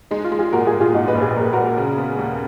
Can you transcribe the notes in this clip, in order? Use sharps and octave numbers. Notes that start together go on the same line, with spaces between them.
G#3 D#4
F4
G#3
F4 G#4
A#2 F#4 A#4
F4 G#4
A#2
F4 G#4
A#2 D#4 F#4
B4 D#5
A#1
G#4 B4
A#1 A#4
B4
G#3 F#4 A#4
C#3
B3
D#2